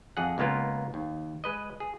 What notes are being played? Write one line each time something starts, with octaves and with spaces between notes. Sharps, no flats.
F2 G#4 F#5
C#2 G#3 A#3 B3 F4 A#4
D#2
G#3 B4 D#5
G#4